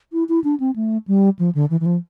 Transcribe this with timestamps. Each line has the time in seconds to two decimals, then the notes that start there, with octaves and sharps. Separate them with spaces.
0.13 E4
0.29 E4
0.44 D4
0.60 C4
0.76 A3
1.08 G3
1.39 F3
1.55 D3
1.70 E3
1.80 E3
1.86 F3